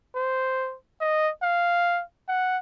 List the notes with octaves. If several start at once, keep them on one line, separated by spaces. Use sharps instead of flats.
C5
D#5
F5
F#5